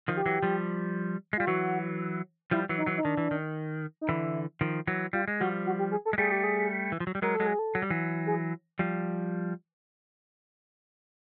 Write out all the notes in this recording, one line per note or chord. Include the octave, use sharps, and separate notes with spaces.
D#3 F3
G4
E3 F#3
F3 G3
G#3
G3 F4
E3 F#3 F#4
F3 G3 E4
E3 F#3
D#4
E3 F#3
D#4
D#3 D4
E3
D#3
D#4
D3 E3 E4
D#3 F3
E3 F#3
G3 F4
G#3
F3 G3 F#4
F#4
G4
G#4
A4
G#3
G3 A3 G#4
G4
G#4
E3
F3
F#3
G3
F#3 G#3 A#4
A4
F#3 G#3
G#4
A4
F#3
G3
E3 F#3
G#4
F3 G3